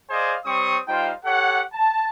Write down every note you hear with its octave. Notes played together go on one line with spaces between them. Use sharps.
G#4 C5 D5 D#5 F5 G#5
G3 C4 C#5 C#6 D#6
G3 D#4 F4 C5 F5 G5
G4 A4 C#5 F#5
A5